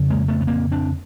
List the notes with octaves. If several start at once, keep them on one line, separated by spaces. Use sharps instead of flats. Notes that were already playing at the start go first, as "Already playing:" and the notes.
Already playing: F2 C#3
G#3 A#3
A3 B3
B3
A#3 C4
C4 D4